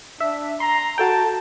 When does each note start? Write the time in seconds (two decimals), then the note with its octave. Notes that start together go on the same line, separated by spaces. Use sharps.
0.21 D4 E5
0.60 A#5 C6
0.98 F#4 A4 G5 A5